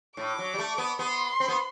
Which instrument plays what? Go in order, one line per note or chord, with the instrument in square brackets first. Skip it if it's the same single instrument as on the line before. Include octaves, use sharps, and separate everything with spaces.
[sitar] A2 [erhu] D6
[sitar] F#3
G3
A3
B3
[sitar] B3 [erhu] C6
[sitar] C4
B3